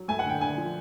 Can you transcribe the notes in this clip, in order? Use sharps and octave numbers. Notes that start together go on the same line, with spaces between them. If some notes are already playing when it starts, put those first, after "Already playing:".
Already playing: F#3
A3 G#5
F#5
D3
G5
D3 G#5
F3